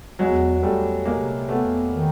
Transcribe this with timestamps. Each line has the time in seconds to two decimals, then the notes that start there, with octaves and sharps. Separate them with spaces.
0.19 E2 F#3 G#3
0.62 E2 G3 A3
1.05 C3 G#3 A#3
1.49 E2 A3 B3
1.93 D#3